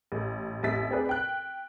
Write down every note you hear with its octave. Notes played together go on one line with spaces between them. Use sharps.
A1
A1 F2 E5 A6 B6
C4 G#4 B4 D5
G5 F#6